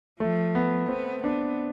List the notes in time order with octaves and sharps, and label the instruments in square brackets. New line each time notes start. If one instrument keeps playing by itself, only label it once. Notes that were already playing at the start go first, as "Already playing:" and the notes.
[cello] F3 [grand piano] A3
[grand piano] B3
[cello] B3 [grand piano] C4
[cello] B3 [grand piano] D4